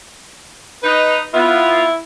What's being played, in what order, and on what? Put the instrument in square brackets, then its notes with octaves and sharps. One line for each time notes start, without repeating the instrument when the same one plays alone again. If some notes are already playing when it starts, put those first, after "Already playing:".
[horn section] D#4 [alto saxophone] B4
[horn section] B3 F4 [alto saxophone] E4